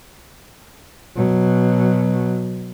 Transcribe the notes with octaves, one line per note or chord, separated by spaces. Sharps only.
B2 F#3